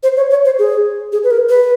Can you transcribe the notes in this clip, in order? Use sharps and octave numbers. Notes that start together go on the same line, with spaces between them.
C5
C#5
C#5
C5
G#4
G#4
B4
A#4
B4